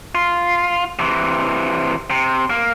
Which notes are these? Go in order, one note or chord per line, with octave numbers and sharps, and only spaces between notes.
F4
C3 E3
C3
A#3